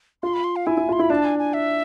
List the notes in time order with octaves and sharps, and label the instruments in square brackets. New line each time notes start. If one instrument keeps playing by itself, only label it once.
[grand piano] F4 [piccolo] C6
[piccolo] B5
C6
F5
[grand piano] E4 [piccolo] G#5
[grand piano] E4
[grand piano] F4 [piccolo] C6
[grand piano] E4 [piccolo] B5
[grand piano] D4 [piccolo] A5
[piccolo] G#5
G#5
E5